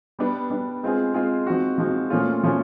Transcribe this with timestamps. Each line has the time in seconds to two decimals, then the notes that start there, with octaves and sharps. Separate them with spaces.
0.19 G3 B3 D4
0.50 G3 B3 D4
0.83 G#3 C4 F4 G#4
1.14 G#3 C4 F4 G#4
1.46 F3 G#3 C4 D#4 F#4
1.78 F3 G#3 C4 D#4 F#4
2.10 A#2 F3 A3 C#4 F4
2.42 A#2 F3 A3 C#4 F4